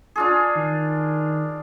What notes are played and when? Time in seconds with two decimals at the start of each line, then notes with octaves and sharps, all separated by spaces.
0.16 D4 F4 G#4
0.56 D#3